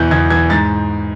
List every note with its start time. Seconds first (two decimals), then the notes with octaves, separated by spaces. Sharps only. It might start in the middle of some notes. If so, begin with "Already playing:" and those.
Already playing: E2 B2 E3 G6
0.11 E2 G#6
0.30 E3 G#6
0.50 G#2 A6